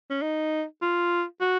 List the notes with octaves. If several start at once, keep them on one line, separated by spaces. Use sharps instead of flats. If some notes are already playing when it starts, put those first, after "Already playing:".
C#4
D#4
F4
F#4